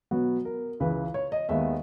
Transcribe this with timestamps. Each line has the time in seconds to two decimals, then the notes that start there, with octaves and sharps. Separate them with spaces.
0.11 B2 F#3 B3 F#4
0.45 A#4
0.80 C#2 C#3 E3 B4
1.14 C#5
1.32 D#5
1.49 D#2 D#3 G#3 B3 E5